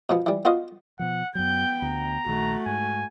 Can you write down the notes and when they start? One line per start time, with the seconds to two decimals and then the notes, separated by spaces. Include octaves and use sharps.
0.09 B2 F3 B3
0.26 E3 G3
0.45 B3 F4 F#4 C5 D#5
0.99 B2 F3 F#5
1.35 F#2 F#3 B3 G5 G6
1.82 D2 A#5
2.26 A#1 D#3 A3 F#4
2.66 G#2 G#5